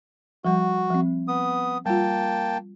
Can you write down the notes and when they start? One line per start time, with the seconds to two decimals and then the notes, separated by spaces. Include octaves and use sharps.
0.45 F3 G3 F#4
0.90 F3 C4
1.28 B3 D#6
1.86 G3 A#3 F4 G5 A5